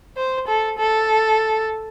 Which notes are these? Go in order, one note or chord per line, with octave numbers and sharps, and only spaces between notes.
C5
A4
A4